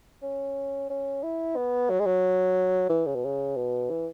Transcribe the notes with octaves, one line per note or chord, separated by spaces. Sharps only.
C#4
C#4
E4
B3
F#3
G#3
F#3
E3
C#3
B2
C#3
B2
E3